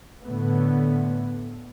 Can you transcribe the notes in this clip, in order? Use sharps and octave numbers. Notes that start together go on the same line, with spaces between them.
A2 D3 A3 B3